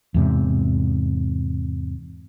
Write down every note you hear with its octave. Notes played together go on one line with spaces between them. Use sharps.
E2 G#2 C3